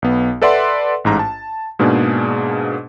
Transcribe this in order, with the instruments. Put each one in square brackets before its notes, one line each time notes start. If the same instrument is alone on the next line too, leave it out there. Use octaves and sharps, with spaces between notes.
[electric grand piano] B1 B3
A4 B4 D5 E5 F#5 C6
A1 G#2 A#5
A5
G#2 B2 A#3 D4 G#4